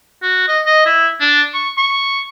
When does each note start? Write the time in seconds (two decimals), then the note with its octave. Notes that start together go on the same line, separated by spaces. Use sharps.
0.22 F#4
0.48 D#5
0.66 D#5
0.86 E4
1.20 D4
1.54 C#6
1.77 C#6